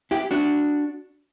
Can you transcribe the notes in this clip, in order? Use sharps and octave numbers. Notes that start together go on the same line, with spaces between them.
E4 G4
D4 F#4